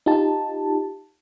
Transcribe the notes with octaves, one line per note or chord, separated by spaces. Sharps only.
D#4 F4 G4 A5